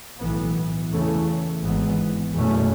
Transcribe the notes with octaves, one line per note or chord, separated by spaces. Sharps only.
B1 A2 E3 B3
E2 C#3 E3 A3 C#4
G#1 G#2 E3 B3
F#1 E2 B2 A3 C#4